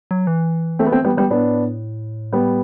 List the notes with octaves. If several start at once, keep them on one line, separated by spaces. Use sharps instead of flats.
F#3
E3
A3 C4
B3
A3 C4
G3 B3
G3 B3
A2 B3 D4
G3 B3